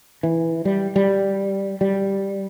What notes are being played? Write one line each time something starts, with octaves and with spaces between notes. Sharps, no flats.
E3
G3
G3
G3